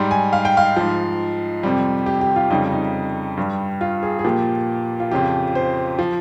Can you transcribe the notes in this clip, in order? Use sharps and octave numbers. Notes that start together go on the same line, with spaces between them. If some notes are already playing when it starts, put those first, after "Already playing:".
Already playing: G#2 G3
G#5
F5
G5
F5
G#2 F3
F2 C3 G3
G4
G4
F4
F2 C#3 G3 D#4
D#4
G2 G3
F4
G#4
G#4
A#2 F3 G4
F4
F2 C#3 F3 G4
C5
F3